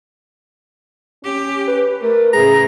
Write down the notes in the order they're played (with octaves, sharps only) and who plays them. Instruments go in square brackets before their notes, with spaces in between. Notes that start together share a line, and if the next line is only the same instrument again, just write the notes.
[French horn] C#4 [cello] G4
[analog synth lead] B4
[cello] A3 [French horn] A#4
[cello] A2 C#3 [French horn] G#4 [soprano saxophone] A#5